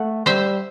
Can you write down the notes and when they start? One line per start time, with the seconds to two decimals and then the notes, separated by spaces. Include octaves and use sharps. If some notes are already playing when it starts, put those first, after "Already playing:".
Already playing: A3 F#5
0.26 G3 C5 E5